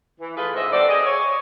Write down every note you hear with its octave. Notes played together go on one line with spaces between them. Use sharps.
E3
A3 F4 G#4 B4
G#2 C#3 E3 C4 D#5 E5
C4 F#4 G4 A4 D5
G#4 D#5
C#5